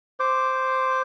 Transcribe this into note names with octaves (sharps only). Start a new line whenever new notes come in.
C5 D6